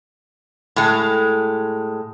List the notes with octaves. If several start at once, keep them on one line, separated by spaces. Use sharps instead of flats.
A2 G#3